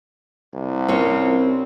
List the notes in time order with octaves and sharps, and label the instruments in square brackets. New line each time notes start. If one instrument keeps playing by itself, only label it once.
[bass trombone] C2
[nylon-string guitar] C4 C#4 C#5 [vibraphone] F4 A#4
[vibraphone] D4